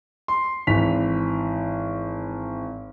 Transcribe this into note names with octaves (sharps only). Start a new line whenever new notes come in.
C6
G#1 E3 B6 F7